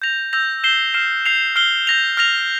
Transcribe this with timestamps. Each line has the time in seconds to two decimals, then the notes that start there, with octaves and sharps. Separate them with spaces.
0.02 G6 A#6 F7
0.33 E6 G6 A#6 F7
0.64 G6 C7 E7 G7
0.94 F6 C7 E7
1.26 G6 C7 F7
1.56 F6 C7 G7
1.87 G6 A#6 F7
2.17 F6 A#6 F7